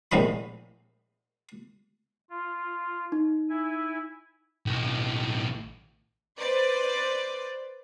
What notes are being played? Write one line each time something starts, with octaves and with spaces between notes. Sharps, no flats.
A#1 A2 C3 G#3 B5
F4
D#4
E4 G#5
B1 A2
B4 C5 D5